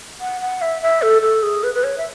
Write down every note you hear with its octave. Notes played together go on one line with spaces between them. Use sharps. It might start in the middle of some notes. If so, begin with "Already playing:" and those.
F#5
F#5
E5
E5
A4
A4
G#4
B4
B4
C#5
E5